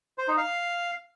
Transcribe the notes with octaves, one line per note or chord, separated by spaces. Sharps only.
C5
D#4
F5